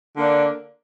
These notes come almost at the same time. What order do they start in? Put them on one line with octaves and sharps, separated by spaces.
D3 A#3 D4